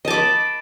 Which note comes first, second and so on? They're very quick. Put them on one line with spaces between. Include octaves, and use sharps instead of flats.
D#5 A5 D6 B5